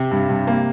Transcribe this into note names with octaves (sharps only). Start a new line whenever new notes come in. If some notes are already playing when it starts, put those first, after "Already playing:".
Already playing: C3
G2
G2
A#3